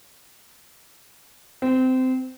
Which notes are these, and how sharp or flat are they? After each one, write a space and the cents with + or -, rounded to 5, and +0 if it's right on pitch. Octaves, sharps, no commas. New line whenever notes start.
C4 -20